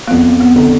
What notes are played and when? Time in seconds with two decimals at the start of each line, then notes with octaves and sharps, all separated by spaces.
0.08 A#3
0.11 F2 B3
0.40 B3
0.56 D3